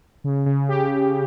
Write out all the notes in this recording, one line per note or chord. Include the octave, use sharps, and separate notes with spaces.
C#3
C#3
G4
G4